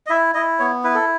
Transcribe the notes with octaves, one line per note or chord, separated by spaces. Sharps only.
D#5
E4 E5
E4 D#5
B3 C#5
E4 B4
A4